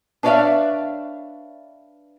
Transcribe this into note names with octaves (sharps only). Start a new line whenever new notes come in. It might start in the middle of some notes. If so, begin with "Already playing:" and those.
D4 B4 C#5 D5 E5 F5